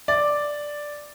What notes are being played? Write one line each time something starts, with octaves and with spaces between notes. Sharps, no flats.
D5